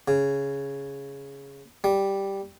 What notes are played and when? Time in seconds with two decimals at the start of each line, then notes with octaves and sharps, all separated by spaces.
0.08 C#3
1.84 G3